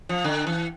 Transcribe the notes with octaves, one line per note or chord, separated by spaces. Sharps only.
F3
D3
E3